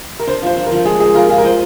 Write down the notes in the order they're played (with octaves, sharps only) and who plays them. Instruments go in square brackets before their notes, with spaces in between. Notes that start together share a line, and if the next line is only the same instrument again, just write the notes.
[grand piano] A#4
[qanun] D4 [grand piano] C5
[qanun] F3 [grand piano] C5
[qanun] D4
[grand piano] A#4
[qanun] F3
[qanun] G#3 [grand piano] G#4
[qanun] G#3 [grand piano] G#4
[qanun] F4 [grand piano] A#4
[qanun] F4 [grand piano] G#4
[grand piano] A#4
[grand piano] C5 [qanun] D#5